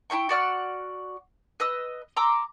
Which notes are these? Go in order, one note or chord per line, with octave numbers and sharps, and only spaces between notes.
E4 F4 G5 C#6
F#4 D5 F#5 F6
B4 D#5 E6
A#5 C6 D6 E6